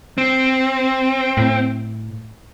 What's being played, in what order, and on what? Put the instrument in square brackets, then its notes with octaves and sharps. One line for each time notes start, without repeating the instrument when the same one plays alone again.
[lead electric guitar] C4
[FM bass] A2